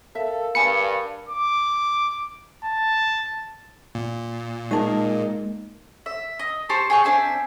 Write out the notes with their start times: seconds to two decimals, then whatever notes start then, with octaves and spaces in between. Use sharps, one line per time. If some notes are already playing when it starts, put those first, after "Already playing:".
0.15 A4 A#4 E5 F5
0.55 G2 G#5 A5 B5 C#7
1.29 D6
2.65 A5
3.95 A#2
4.71 G#3 A#3 D#4 G#4 A#4 D#5 A5
6.06 E5
6.39 D#5
6.69 G4 C5 A5 C#6
6.90 G#4 G5 C#6
7.04 C4 D4 E5 G#5